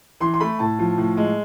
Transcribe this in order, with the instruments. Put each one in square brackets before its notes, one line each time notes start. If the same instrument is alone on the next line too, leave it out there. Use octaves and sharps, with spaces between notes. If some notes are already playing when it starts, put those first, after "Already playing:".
[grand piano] E3 C6
C6
A3 B5
A2 A5
F3
A2
G#3